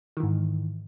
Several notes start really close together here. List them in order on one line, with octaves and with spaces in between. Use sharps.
D#3 E3 G#2